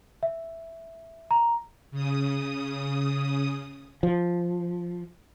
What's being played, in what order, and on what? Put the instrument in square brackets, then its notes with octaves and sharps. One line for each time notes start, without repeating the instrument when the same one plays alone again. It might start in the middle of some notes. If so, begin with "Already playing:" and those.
[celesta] E5
A#5
[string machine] C#3 D#6
[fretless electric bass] F3